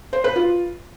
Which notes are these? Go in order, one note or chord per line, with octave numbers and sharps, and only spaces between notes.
C5
B4
F4